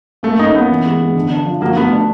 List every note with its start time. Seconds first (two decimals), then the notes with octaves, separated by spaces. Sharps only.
0.23 A3 A#3
0.39 C#4 D#4
0.54 A#3 B3
0.69 E3
0.85 G#3
1.00 G#3
1.15 D3
1.30 D4
1.46 F3
1.61 A#3 F#4
1.77 A3 B3
1.92 D4